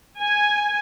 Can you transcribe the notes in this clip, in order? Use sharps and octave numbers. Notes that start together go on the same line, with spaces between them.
G#5